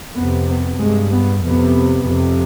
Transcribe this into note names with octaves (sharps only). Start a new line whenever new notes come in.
F2 C3 B3
B3
G2 G#3
B3
F2 C3 B3
F2 C3